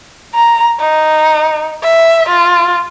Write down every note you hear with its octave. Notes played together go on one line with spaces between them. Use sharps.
A#5
D#4
E5
F4